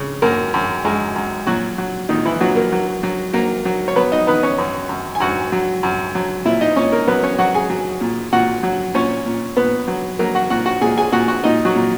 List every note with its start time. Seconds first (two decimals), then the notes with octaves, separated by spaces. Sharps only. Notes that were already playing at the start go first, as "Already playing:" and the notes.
Already playing: C#3
0.22 F#2 A#3 A#4
0.54 F#2
0.85 F#2 G#3 G#4
1.16 F#2
1.47 A#2 F#3 F#4
1.78 F#3
2.09 A#2 D#3 D#4
2.25 E3 E4
2.40 A#2 F#3 F#4
2.56 A#3 A#4
2.72 F#3
3.03 F#3
3.33 F#3 A#3 A#4
3.65 F#3
3.88 C#5
3.96 F#3 B3 B4
4.12 D#4 D#5
4.27 D#3 B3 B4
4.43 C#4 C#5
4.58 F#2
4.89 F#2
5.15 G#5
5.20 F#2 F#4 F#5
5.52 F#3
5.83 F#2
6.15 F#3
6.45 A#2 E4 E5
6.61 D#4 D#5
6.76 A#2 C#4 C#5
6.92 A#3 A#4
7.07 F#3 B3 B4
7.23 C#4 C#5
7.38 F#3 F#4 F#5
7.54 G#4 G#5
7.70 F#3
8.01 A#2
8.32 A#2 F#4 F#5
8.63 F#3
8.94 A#2 C#4 C#5
9.26 A#2
9.57 A#2 B3 B4
9.88 F#3
10.19 F#3 A#3 A#4
10.35 F#4 F#5
10.50 A#2 F#4 F#5
10.66 F#4 F#5
10.81 A#2 G#4 G#5
10.97 G#4 G#5
11.12 A#2 F#4 F#5
11.28 F#4 F#5
11.44 A#2 D#4 D#5
11.65 F#3 F#4
11.75 A#2